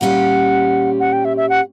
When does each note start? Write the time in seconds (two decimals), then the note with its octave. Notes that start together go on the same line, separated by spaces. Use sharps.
0.01 A#2 G3 C#4 G4 F#5
1.00 F#5
1.13 G5
1.25 E5
1.37 E5
1.49 F#5